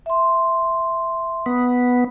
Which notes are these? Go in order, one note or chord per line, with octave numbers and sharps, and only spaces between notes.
E5 C6
B3